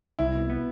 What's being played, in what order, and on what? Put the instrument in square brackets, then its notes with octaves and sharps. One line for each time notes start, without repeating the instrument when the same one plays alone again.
[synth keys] C2 [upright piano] E4
[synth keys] B2
B3